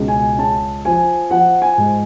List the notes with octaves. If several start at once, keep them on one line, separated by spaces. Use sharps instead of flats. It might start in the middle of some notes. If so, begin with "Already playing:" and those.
Already playing: C#2 B2
G#5
C#3 A5
F3 G#5
F3 F#5
G#5
G#2